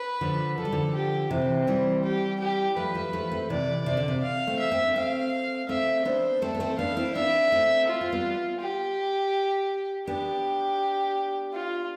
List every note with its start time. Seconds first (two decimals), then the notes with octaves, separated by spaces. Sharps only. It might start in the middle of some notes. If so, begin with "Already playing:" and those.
Already playing: B4
0.21 D3 F3
0.57 F3 A4
0.65 G3
0.72 D3 F3
0.94 G4
1.30 C3 E3 C4
1.67 E3 G3
2.03 G4
2.40 G4
2.77 F3 A3 B4
2.95 F3 A3
3.13 F3 A3
3.31 A3 C4
3.50 C3 E3 D5
3.86 C3 D5
3.97 D3
4.08 C3
4.23 F5
4.47 A3 C4
4.59 E5
4.72 C4
4.84 D4
4.95 A3 C4 F5
5.69 A3 C4 E5
6.05 B3 D4 C5
6.42 A3 C4 A4
6.54 B3
6.60 A3 C4
6.78 B3 D4 F5
6.97 C4 E4
7.15 B3 D4 E5
7.52 A3 C4
7.88 F4
8.01 C4
8.12 G3 B3
8.61 G4
10.07 B3 D4 G4
11.53 F4